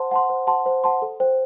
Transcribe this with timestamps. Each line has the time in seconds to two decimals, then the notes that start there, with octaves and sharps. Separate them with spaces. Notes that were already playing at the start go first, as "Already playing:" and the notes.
Already playing: C5 F#5 A5 C6
0.11 F#5 A5 C6
0.30 C5
0.47 F#5 A5 C6
0.66 C5
0.84 F#5 A5 C6
1.02 A4
1.20 C5 G5